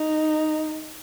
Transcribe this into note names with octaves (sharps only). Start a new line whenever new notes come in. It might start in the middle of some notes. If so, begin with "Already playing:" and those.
Already playing: D#4